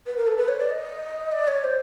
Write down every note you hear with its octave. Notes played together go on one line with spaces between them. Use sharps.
B4
A#4
A4
B4
C#5
D5
D#5
D5
C#5
C5